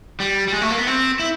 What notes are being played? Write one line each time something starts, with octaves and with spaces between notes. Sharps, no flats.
G3
G3
G#3
A3
A#3
B3
C4
E4